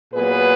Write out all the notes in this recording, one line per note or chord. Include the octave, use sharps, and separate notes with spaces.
A#2 F#3 B3 G#4 B4